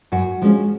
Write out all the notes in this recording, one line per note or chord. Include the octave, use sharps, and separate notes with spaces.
F#2 F#4
F3 G#3 C#4